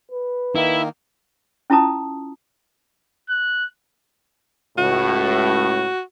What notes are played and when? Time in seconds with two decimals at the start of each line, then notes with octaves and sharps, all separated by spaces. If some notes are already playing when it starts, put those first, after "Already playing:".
0.11 B4
0.55 D#3 A#3 E4
1.70 C#4 E4 F4 A5 A#5 D#6
3.29 F#6
4.78 C#2 A2 F#4